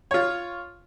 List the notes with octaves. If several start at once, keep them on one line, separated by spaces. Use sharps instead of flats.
F4 C#5